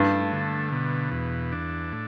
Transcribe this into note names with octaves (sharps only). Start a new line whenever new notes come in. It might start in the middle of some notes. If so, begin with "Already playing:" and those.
Already playing: G2 A3
D3
B2
E2
D4
A2